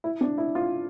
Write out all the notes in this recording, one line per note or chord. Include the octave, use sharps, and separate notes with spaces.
E4
D4
E4
F4